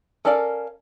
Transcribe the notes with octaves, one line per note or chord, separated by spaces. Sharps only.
C#4 A4 A#4 D5 F5